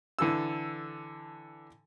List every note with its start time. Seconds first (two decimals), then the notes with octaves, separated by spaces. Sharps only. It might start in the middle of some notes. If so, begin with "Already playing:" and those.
0.19 D3 E3 A4 E6